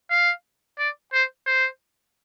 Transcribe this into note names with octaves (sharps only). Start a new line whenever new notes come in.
F5
D5
C5
C5